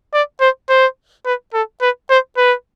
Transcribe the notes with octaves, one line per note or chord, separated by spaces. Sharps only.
D5
C5
C5
B4
A4
B4
C5
B4